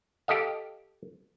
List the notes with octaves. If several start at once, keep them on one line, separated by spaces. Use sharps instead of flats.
G4 A4 D#5 F5